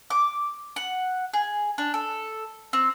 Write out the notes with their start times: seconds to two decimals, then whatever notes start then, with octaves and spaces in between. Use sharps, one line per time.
0.10 D6
0.76 F#5
1.33 G#4
1.78 D4
1.94 A4
2.73 C4